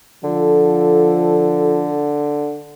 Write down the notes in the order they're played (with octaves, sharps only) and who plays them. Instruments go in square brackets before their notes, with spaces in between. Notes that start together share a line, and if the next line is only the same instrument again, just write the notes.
[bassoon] D3 [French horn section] F3 A4